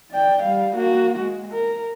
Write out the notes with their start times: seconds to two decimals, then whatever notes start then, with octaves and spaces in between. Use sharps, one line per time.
0.11 D5 G5
0.42 G3 F5
0.75 A#3 F#4
1.19 G#3
1.52 A#4